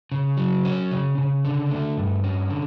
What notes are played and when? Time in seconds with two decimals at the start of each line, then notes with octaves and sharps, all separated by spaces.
0.12 C#3
0.37 F#3
0.65 C#4
0.91 C#3
1.18 C#3
1.45 D3
1.71 A3
1.97 G2
2.24 C#4
2.50 D3